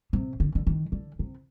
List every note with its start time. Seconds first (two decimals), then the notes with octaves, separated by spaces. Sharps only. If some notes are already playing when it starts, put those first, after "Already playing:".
0.13 C3
0.40 D3
0.55 D3
0.67 D#3
0.92 D3
1.19 C3